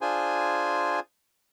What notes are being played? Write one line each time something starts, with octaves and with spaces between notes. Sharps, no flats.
D4 F4 G#4 C5 G#5